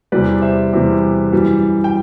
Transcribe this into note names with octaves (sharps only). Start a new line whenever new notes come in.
E2 C3 E3 G3 B4 D5
C5 E5
E2 C3 E3 G3
F#2 E3 G3
G5